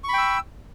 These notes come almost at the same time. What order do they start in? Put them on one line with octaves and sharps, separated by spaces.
C#6 B5 G5 E6